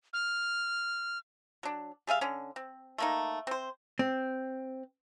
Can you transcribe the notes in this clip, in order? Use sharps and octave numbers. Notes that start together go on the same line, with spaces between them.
F6
F#3 D4
G3 G#4 E5 F5
D3 C#4
C4
A3 A#3 D#4
C4 C5
C4